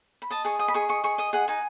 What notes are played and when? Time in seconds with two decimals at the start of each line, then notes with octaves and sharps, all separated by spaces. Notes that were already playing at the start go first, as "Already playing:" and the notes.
0.22 B5
0.30 D#5 A5
0.45 G#4 C#6
0.59 D#5 D#6
0.68 B5
0.74 G#4 C#6
0.89 D#5 C#6
1.04 G#4 C#6
1.18 D#5 D#6
1.33 G#4 F#5
1.48 D#4 G#5